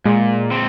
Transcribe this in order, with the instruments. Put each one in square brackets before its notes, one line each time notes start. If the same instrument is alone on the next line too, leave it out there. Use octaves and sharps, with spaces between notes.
[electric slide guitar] A#2 [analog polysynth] G#3
[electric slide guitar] C4